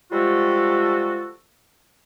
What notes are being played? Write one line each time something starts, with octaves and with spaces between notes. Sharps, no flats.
F3 G3 G#3 F4 F#4 A4